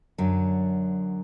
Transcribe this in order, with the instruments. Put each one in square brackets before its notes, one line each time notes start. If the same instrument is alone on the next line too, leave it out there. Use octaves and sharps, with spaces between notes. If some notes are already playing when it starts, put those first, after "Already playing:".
[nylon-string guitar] F#2 D3 F#3